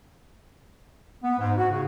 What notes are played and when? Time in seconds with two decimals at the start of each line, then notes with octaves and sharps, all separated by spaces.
1.23 B3
1.39 G#2
1.57 F#4
1.70 C#3